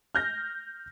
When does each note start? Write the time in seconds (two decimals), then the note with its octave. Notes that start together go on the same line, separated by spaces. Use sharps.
0.15 F6 G6 A#6